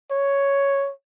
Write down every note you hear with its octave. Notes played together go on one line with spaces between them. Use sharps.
C#5